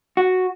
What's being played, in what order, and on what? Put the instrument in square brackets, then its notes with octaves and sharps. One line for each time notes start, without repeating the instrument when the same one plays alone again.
[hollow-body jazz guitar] F#4